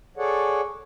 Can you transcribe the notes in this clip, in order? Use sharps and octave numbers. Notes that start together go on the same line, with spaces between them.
G#4 A4 C#5 D5 F#5